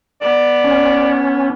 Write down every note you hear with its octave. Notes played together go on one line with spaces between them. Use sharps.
B3 D5
C#4